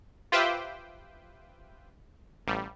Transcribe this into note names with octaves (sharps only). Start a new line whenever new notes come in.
F4 G4 B4 C5 E5 G5
A1 G3